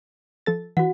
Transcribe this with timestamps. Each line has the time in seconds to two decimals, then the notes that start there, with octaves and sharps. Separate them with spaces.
0.46 F3 A4 A6
0.77 E3 F#4 F#5